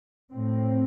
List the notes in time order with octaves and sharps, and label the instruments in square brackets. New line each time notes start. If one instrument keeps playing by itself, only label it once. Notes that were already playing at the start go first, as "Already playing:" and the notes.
[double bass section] A2 C4